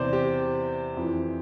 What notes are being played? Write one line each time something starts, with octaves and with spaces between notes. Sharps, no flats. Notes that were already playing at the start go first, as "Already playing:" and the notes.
Already playing: E2 C3 E3 C5 D5
G4
F2 E3